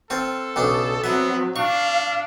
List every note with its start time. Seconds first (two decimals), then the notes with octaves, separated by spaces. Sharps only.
0.10 C4 F4 A4
0.56 B1 C#3 D4
1.04 F#3 B3 C4 E5
1.56 D4 F5 C#6